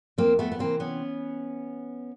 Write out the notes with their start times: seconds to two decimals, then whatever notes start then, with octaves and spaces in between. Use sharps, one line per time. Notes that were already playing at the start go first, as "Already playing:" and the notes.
0.18 F2 A#3 C4
0.39 A3 B3
0.52 B3
0.59 C3 E3 A#3 C4
0.80 B3 C#4